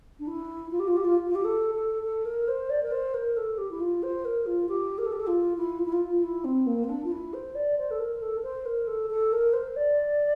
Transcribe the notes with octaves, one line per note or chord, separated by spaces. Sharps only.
D4
E4
F4
G4
F4
G4
F4
F4
G4
A4
A4
A4
A#4
C5
D5
A#4
C5
A#4
A4
G4
E4
F4
C5
A#4
F4
G4
A#4
A4
G4
A4
F4
E4
F4
E4
F4
F4
E4
C4
A#3
C4
D4
F4
E4
C5
D5
C5
A4
A#4
A#4
A4
A#4
C5
A#4
A4
A4
A#4
C5
D5